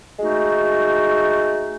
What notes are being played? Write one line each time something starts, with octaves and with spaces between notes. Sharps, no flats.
G#3 A3 D#4 F#4